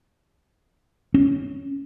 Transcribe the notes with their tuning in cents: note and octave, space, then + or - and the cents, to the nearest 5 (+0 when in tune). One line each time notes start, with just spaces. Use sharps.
C#4 +5